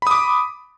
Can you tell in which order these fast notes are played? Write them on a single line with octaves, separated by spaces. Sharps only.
B5 D#6 D6